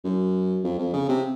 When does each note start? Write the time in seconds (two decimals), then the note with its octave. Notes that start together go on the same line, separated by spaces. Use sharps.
0.05 F#2
0.64 F2
0.79 F2
0.93 C#3
1.09 C3